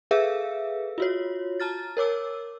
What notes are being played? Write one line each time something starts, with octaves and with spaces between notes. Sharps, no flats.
G#4 A4 B4 E5 F5 E6
F4 F#4 C#5
A5 A#5 F6 A6
A#4 C#5 D6 E6